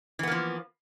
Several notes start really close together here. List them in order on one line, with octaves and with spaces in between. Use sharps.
E3 B3 A#3 F3